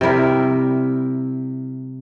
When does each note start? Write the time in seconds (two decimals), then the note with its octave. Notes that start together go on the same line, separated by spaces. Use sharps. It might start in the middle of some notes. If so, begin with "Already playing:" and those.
0.01 C3 G3 E4 A#4